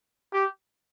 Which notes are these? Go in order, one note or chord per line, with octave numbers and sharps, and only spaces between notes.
G4